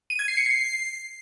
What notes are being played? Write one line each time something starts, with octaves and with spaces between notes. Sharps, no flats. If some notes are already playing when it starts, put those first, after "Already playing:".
D#7
G#6
C7
C#7
C7